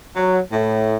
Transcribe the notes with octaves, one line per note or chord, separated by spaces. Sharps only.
F#3
A2